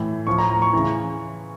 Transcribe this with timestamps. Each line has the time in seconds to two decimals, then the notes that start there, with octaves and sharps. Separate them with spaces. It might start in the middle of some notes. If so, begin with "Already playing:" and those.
Already playing: A2 E3
0.27 A2 F3 C#6
0.38 A#5
0.50 A#5
0.62 C#6
0.73 C#3 E3